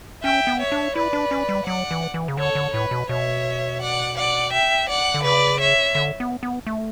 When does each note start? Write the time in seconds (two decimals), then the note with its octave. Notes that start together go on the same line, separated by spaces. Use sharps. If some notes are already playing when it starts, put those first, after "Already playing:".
0.23 C#4 E5 G5
0.47 B3
0.59 C#5 E5
0.72 D4
0.95 E4 B4 D5
1.13 D4
1.31 C#4
1.49 G3
1.66 F#3 D5 F#5
1.91 E3
2.14 E3
2.28 C#3
2.37 D3 A4 C#5
2.55 D3
2.74 A2 B4
2.91 B2
3.09 B2 C#5 E5
3.81 D5 F#5
4.17 D5 F#5
4.52 E5 G5
4.88 D5 F#5
5.14 D3
5.24 C#3 B4 D5
5.59 C#5 E5
5.95 D3
6.20 B3
6.43 B3
6.67 A3